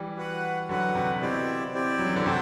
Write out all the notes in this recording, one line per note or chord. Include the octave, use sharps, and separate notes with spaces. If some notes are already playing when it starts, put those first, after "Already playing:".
Already playing: E3 G3
F#4 B4 F#5
D3 F#3 F#4 B4 F#5
C3
B2 C4 E4 G4 D5
C4 E4 G4 D5
F#3
E3
D3
C3 F#4 A4 C5 G5